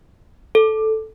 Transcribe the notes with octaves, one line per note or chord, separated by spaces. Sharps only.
A4